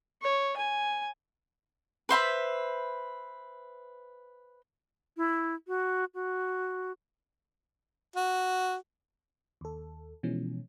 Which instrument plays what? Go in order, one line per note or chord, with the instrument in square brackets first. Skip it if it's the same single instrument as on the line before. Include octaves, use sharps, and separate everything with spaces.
[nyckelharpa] C#5
G#5
[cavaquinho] B4 C5 E5 B5
[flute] E4
F#4
F#4
[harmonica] F#4
[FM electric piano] D#2 A4
B2 E3 F3 G#3 C#4